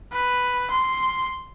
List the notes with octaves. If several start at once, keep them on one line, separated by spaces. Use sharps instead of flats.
B4
C6